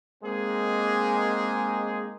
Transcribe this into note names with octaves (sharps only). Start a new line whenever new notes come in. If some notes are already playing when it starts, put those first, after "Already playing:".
G#3 A#3 C4 D#4 G#4